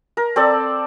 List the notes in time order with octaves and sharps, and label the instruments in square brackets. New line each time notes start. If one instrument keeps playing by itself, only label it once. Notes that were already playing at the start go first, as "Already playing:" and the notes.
[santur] A#4
C4 A4 D5